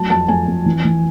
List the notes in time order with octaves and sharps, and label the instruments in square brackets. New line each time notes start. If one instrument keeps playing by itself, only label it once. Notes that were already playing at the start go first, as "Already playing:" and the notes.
Already playing: [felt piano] F#3 A3 A5
F2 A5
F2 G#5
F2
E3
E3